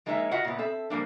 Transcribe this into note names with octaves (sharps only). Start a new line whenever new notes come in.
F3 G#3 A#3 D#4 C#5 E5
F4 F#4 D#5 E5 F#5
A#2 B3
C4 A4 E5
F3 G3 A#3 D4